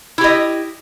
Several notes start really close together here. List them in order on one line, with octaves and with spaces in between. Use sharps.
E4 G4 D#5